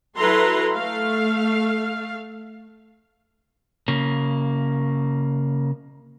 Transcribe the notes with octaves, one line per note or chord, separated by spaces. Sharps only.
F#3 E4 A4 B4 A#5 C6
A3 F5
C#3 A#3